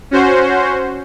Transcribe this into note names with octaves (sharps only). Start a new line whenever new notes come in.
C#4 F#4 C5